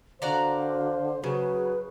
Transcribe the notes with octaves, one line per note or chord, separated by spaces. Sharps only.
D3 F#4 C5 D5 F5 A#5
C#3 F#3 G#4 B4